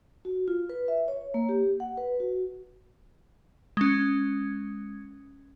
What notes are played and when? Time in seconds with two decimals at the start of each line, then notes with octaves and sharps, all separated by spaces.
0.25 F#4
0.48 F4
0.70 B4
0.88 E5
1.08 C#5
1.34 A#3
1.49 G4
1.80 F#5
1.97 B4
2.20 F#4
3.77 G#3 C#4